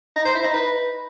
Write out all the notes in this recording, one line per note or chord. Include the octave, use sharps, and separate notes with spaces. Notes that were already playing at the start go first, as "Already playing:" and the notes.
D#4
C5
E4
D#4
B4